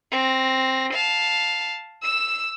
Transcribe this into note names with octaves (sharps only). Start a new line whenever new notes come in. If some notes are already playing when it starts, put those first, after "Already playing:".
C4 A#6
F5 A5
E6 E7